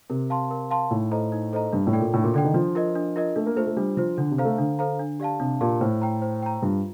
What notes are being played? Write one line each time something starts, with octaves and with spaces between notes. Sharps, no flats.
C3 A#4
F5 A5 C6
A#4
F5 A5 C6
A2 D#4
A4 C5 D#5 A#5
D#4
A4 C5 D#5 A#5
G2 D4
A2
A4 D5 G5
A#2
A2 D4
A#2
D3 A4 D5 G5
D#3
F3 D4
F4 A#4 D#5
D4
F4 A#4 D#5
A3 D4
A#3
A3 F4 C5
A3
G3 D4
F3 F4 C5
D3 D4
C3
A4 C5 F5 A#5
A3
D3 D4
A4 C5 F5 A#5
D4
G4 D5 F5 A5
C3 D4
A#2 G4 D5 F5 A5
A2 C5
G5 A#5
C5
G5 A#5
G2 F4